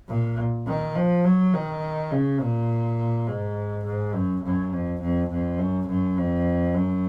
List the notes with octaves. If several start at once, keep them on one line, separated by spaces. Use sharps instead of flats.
A#2
D#3
F3
F#3
D#3
C#3
A#2
G#2
G#2
F#2
F#2
F2
F2
F2
F#2
F#2
F2
F#2